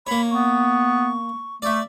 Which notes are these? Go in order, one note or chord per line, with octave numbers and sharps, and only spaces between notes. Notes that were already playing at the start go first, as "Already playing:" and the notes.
A#3 C#5 B5
B3 C#6
A3 D5 E5